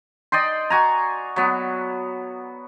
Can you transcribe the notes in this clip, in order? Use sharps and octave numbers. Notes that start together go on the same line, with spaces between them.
D5 D#5 G5 C6
F#4 G#5 A#5
F#3 B3